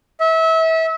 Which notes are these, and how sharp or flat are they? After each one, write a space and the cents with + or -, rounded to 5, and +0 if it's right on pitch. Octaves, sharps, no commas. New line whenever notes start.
E5 -30